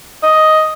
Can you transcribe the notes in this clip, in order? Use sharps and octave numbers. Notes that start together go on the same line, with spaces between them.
D#5